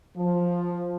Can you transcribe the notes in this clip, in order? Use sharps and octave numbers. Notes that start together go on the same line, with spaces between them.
F3